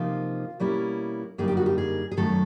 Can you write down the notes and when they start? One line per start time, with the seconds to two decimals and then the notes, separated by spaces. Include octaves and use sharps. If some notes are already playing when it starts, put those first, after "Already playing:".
Already playing: C3 F3 A#3 D#4 F4
0.60 B2 G3 A#3 C#4 E4
1.38 F#2 D3 G3 A#3 D#4 G#4
1.48 G4
1.57 F#4
1.66 G4
1.78 G#4
2.11 G#4
2.17 F#2 D#3 F#3 A3 A4